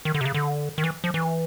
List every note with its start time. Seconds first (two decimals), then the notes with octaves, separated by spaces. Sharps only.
0.05 D#3
0.14 D3
0.21 C3
0.25 C#3
0.34 D3
0.78 D#3
0.84 E3
1.04 F3
1.14 E3